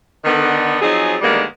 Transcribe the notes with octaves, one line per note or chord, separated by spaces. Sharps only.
D3 D#3 B3
F3 F#3 C4 D#4 G#4
D3 D#3 G3 G#3 A#3 B3